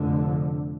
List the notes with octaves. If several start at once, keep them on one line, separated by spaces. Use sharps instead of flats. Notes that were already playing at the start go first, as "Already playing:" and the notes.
Already playing: F1 F2 D3